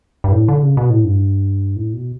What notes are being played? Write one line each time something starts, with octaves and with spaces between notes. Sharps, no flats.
G2
A2
D3
C#3
B2
A2
G2
A2
B2